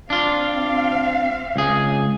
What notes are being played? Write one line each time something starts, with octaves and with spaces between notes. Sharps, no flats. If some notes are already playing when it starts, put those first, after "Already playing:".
C4 D4 F4 F5
C#2 G#4